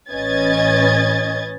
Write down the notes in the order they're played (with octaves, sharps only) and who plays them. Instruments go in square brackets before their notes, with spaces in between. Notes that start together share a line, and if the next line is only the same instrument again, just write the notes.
[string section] A1 C#4 B4 D#5 G#6 A6